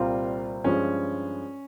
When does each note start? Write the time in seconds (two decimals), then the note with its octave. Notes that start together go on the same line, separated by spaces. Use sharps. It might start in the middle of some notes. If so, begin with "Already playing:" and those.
Already playing: C2 A#2 G3 C4 F4
0.64 G2 F3 G#3 C#4